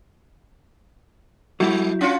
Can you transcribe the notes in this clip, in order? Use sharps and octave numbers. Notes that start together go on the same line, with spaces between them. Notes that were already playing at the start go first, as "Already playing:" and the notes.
F#3 G3 E4
C#4 F4 F#4